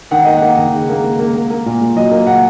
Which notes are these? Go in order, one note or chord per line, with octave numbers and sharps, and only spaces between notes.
D#3 F#5
A#3 D#5
F#5
A#3
D#3
C#3
A#3
A#3
A#3
A#3
A#3
A#2
A#2
F#3 D#5
A#3
A#2 F#5